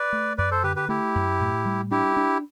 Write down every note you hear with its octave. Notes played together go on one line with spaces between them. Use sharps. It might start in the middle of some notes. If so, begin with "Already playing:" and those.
Already playing: B4 D5
A3
F#2 B4 D5
A4 C5
D3 G4 B4
G4 B4
A3 E4 G4
F#2
A2
G3
D4 E4 G4
D4